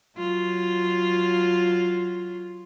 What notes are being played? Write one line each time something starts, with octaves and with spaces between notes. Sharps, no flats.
F#3 F4